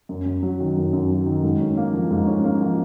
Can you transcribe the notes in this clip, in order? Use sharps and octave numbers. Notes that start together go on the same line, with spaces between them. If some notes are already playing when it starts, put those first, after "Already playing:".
F#2
F#2
F#3
D#3
F#2
F#2
F#3
D#3
G#2
C#4
A#3
F3
G#2
C#4
A#3
F3